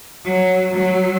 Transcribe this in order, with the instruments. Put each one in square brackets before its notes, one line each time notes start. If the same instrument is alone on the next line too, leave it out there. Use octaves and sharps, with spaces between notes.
[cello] F#3
F#3